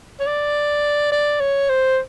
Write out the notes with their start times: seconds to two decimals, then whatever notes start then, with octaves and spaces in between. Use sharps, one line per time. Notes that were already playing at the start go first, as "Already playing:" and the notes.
0.20 C#5
0.27 D5
1.12 D5
1.40 C#5
1.69 C5